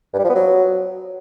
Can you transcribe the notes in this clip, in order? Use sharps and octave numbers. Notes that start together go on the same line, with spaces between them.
G2
G3
F3
B3
F#3